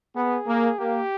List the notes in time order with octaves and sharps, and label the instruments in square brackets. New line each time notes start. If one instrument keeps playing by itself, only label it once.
[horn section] B3 [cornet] G#4
[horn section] A#3
[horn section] A#3 [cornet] G4